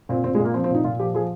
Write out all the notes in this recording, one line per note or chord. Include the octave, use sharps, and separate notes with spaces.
A#2 C4
A#2 C4
G#3
A#2
A#3
F3 C4
C4
A#2 D#4
A#2 F4
F3 G4
F3 G#4